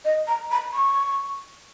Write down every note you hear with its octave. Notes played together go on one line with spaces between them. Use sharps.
D#5
A#5
B5
C#6